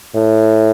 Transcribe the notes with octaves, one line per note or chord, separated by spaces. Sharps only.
A2